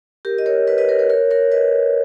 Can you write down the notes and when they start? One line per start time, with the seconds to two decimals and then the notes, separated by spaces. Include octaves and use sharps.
0.25 G4 A#4
0.38 D#5
0.46 A#4 C#5
0.67 B4 D#5
0.78 B4 D#5
0.89 A#4 C#5
0.99 A#4 C#5
1.10 A#4 C#5
1.31 A#4 C#5
1.52 B4 D#5